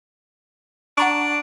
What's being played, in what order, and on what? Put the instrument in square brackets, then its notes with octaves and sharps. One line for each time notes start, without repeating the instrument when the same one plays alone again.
[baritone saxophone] D4 [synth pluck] F#5 A#5 C#6